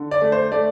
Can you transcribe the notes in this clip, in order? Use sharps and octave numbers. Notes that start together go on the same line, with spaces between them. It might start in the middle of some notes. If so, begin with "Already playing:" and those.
Already playing: D3
D5
A3
C5
A3 D5